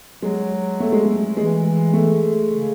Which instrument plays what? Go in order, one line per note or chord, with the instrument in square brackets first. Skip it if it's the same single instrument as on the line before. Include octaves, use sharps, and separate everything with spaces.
[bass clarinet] F#3 [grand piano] G#3
[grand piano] A3
G#3
A3
[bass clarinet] E3 [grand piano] G#3
[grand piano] A3
[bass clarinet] C#3